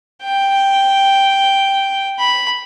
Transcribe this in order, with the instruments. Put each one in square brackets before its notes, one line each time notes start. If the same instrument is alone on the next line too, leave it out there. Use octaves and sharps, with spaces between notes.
[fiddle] G5
B5